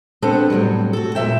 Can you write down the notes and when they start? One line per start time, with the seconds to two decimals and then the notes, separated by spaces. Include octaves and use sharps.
0.22 B3 C4 D4 A4 C5
0.50 A2 C3 F#3 G3
0.93 F#4 A4
1.15 E2 A#2 F#3 E5 G5